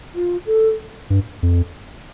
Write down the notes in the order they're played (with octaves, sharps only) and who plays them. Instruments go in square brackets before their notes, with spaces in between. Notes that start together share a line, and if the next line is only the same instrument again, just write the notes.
[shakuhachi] F4
A4
[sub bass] G2
F2